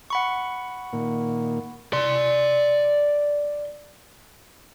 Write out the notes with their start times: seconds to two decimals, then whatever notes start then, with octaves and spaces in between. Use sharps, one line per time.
0.10 F#5 B5 C#6
0.93 A#2 D#3 A#3
1.93 D5 C6